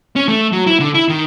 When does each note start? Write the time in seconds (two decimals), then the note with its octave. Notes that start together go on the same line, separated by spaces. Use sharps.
0.16 C#4
0.28 A3
0.52 F#3
0.67 E4
0.80 D3
0.94 E4
1.09 D#3